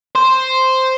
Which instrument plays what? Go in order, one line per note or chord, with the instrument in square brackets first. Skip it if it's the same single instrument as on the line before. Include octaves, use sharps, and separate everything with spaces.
[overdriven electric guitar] C5